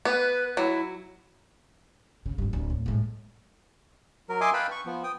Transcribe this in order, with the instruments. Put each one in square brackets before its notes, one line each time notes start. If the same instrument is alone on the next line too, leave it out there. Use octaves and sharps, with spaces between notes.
[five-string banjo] B3 [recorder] B4
[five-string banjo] F#3 [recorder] E4
[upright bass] C#3
G#1 G2
D1 D3
A2
A2 G#3
[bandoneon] F#3 A#4
D#5 E5 G#5 C6 D6 D#6
B4 F5 G5 A5 B5
C#6
F3 B3
G5 D#6